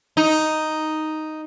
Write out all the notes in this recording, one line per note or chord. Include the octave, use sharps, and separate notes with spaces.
D#4